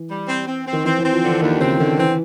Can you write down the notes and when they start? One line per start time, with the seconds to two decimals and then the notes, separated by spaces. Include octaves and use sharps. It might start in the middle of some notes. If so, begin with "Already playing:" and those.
Already playing: E3
0.09 G3
0.27 C4
0.46 C4
0.65 C4
0.73 D#3
0.84 E3 C4
0.98 E3 C4
1.13 F3
1.22 D3
1.27 E3
1.41 D#2 D#3
1.60 C#3 C4
1.79 D3 D#3
1.98 E3 C4